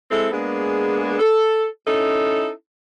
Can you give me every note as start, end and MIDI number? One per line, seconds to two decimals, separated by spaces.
0.11 0.28 56
0.11 0.28 60
0.11 0.28 64
0.11 0.28 69
0.32 1.15 56
0.32 1.15 58
0.32 1.15 59
0.32 1.15 62
0.32 1.15 68
1.19 1.66 69
1.86 2.49 61
1.86 2.49 63
1.86 2.49 64
1.86 2.49 69